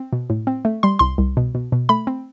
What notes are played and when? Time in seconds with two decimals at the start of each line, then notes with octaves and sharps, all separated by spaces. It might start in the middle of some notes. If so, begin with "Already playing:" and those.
Already playing: C4
0.13 B2
0.30 A2
0.47 C4
0.65 A3
0.83 G3 C6
0.99 C2 C6
1.18 C2
1.37 B2
1.55 B2
1.72 B2
1.89 A3 B5
2.07 C4